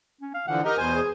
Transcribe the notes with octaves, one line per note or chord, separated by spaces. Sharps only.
C#4
F5
D3 E3 F3 F#5
D#4 G4 A#4 D#5
E2 B2 C5 G#5
G#4